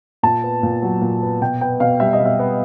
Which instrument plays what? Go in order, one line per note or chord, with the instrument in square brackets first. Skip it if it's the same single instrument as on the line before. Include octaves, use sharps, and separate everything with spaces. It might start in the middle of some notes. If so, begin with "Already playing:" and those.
[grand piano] A#2 A5
B3
A#2
F#3
A#2
B3
B2 G5
B3 G5
B2 F5
G3 E5
D#5
B2
E5
B3